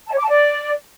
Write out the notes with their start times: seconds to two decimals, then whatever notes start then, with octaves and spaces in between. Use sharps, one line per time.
0.07 A5
0.13 C#5
0.18 D6
0.23 A5
0.28 D5